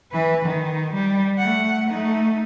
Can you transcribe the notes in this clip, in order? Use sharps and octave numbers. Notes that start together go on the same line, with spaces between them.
E3 B4
D#3
G3
A3 F#5
A3 D#4